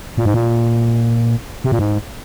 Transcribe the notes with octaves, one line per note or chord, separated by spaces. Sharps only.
A#2
G#2
A#2
C3
A#2
G#2